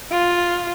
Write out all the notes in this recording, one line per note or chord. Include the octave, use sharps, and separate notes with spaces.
F4